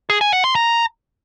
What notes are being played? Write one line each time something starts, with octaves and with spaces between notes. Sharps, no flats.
G#4
G#5
F#5
C6
A#5